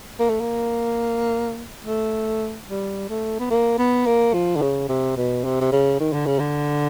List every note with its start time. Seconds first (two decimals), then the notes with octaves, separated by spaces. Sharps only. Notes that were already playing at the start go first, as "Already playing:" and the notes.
0.20 A#3
0.30 A3
0.40 A#3
1.85 A3
2.68 G3
3.09 A3
3.40 B3
3.50 A#3
3.78 B3
4.06 A#3
4.34 F3
4.56 D3
4.62 C#3
4.89 C3
5.17 B2
5.45 C3
5.61 C3
5.72 C#3
6.00 D#3
6.13 D3
6.26 C#3
6.39 D3